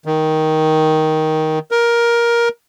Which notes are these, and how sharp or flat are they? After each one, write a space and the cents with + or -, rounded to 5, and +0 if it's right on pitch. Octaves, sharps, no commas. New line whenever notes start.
D#3 +10
A#4 +15